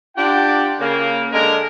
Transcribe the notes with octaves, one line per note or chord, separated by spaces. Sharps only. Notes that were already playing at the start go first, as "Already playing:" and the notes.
D4 F4 G4 F#5 G5
C#3 A#3
D3 G#3 A#4